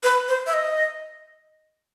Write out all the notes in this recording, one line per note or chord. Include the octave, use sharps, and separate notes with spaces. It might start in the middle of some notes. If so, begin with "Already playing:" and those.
B4
C5
E5
D#5